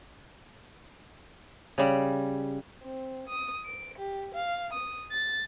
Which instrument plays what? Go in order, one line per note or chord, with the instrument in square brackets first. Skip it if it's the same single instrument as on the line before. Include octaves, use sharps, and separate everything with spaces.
[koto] C#3 G3
[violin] C4
D#6
D7
G4
F5
D#6
A6